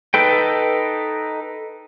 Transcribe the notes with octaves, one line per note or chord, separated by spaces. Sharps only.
D#4 A4 B4 G5